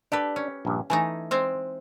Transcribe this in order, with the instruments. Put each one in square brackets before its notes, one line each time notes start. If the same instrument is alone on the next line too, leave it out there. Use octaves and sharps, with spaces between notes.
[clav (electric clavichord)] D4 [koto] G4 A4 B4
[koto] C#4
[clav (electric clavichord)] A#1 G2
[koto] E3 A3 D#4 [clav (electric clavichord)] G#5
[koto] G#3 C4 C5